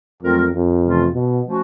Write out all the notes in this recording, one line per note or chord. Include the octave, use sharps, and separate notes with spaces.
F2 F#3 A3 C4 F4 A#4
F2
C3 E3 A3 C#4 F4
B2
F3 A3 C#4 F#4